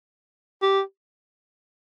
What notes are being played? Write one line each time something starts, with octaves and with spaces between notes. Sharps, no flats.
G4